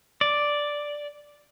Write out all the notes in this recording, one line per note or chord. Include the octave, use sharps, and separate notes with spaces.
D5